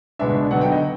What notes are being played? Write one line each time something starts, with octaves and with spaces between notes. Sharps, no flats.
C#2 B2 G#3 B3 D4 E5
D3 F#3 B3 D#4 F#5
G5
D#5